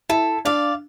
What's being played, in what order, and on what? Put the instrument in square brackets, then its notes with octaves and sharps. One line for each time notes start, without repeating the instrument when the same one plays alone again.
[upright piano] E4 [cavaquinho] A4
[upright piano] D4 [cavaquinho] D5 F5